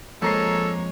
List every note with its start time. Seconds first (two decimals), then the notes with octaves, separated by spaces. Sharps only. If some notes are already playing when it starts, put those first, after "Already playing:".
0.22 F2 F3 G#3 A#3 A4 C#5 A#5 C7